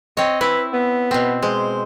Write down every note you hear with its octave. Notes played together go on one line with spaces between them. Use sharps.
C4 C#5 D#5
E4 B4
B3
B2 C4
G#3 C5